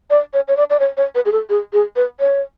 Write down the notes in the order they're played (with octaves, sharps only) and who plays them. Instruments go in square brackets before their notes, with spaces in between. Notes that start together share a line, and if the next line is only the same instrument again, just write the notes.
[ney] D5
C#5
C#5
D5
D5
C#5
C#5
B4
G#4
A4
G#4
G#4
B4
C#5